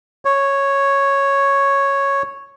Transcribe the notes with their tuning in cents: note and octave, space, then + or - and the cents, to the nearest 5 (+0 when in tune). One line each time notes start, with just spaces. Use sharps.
C#5 -5